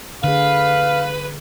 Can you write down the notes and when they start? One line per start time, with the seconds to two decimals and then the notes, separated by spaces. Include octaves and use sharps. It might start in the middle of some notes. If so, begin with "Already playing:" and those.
0.24 D3 G#4 B4 F5